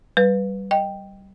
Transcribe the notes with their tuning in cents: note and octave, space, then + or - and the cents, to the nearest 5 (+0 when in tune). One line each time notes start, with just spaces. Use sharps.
G3 -20 B4 +0
D#5 +0 G5 +0